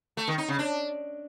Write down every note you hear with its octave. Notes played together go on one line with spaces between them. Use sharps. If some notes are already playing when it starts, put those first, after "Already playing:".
A3
D#3
D#4
C#3
D4